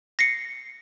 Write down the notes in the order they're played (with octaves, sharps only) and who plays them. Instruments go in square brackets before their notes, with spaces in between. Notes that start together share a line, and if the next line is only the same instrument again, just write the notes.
[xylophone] A#6 C7 C#7